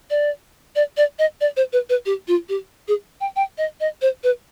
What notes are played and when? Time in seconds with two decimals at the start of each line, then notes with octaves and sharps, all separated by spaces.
0.10 D5
0.76 D5
0.97 D5
1.19 D#5
1.41 D5
1.57 C5
1.73 B4
1.89 B4
2.06 G4
2.28 F4
2.49 G4
2.88 G#4
3.21 G5
3.36 G5
3.58 D#5
3.80 D#5
4.02 C5
4.24 B4